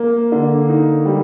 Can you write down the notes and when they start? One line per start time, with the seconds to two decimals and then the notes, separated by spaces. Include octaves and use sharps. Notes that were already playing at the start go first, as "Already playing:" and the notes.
Already playing: A#3
0.32 D3
0.69 D#4
1.05 G3